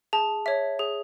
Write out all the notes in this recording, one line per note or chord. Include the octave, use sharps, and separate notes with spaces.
G#4 A5
C#5 E5
G#4